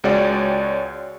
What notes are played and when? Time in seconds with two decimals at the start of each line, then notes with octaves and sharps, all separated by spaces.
0.04 C#2 G#3 F#4 C#5 D5 G5